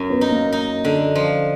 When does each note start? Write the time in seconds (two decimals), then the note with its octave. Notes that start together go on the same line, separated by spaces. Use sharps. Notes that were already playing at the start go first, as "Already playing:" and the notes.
Already playing: F#2
0.10 B3
0.21 D#4
0.31 A#3
0.52 D#4
0.85 D3
1.15 F3